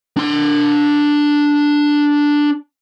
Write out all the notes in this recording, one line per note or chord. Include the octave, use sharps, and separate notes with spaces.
D4 C6